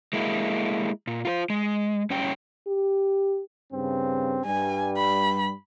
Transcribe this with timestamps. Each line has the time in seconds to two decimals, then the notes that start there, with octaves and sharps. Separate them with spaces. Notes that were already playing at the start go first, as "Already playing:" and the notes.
0.13 G#3 A#3 E4
1.07 A#2
1.25 F4 A#4 C5
1.50 G#3
2.10 G2 C#4 C#5 G5
2.68 G4
3.73 G2 C#3 C4
4.46 G2 G3 G#5
4.97 B5